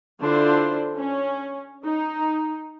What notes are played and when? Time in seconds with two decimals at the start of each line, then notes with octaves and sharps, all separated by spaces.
0.21 D3 D4 E4 F4 C5
0.96 C#4
1.84 D#4